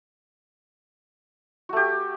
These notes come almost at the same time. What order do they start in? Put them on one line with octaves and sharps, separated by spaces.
F#4 A3 G4